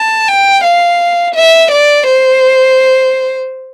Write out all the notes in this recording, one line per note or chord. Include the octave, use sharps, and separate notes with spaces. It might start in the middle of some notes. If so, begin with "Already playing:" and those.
Already playing: A5
G5
F5
E5
D5
C5